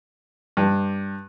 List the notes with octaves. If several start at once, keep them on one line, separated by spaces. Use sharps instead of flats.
G2